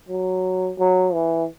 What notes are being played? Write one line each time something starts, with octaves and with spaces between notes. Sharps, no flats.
F#3
F#3
E3